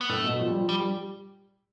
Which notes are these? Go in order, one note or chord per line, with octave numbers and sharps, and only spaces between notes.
B3
A2 A3
B2
F3
G3
F3
G3
G3